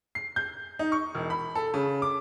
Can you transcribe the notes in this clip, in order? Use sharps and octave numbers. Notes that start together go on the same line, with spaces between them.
C7
G6
D#4
C#6
E1
B5
A4
C#3
D6